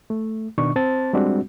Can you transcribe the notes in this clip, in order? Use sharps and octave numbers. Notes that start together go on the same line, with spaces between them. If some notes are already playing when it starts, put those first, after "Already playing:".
A3
B2 D#3 D4 C#6
C4 C5 A5 A6
G3 G#3 C4 D4 F#4